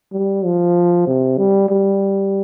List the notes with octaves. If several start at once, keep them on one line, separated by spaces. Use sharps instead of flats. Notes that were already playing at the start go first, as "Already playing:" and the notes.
G3
F3
C3
G3
G3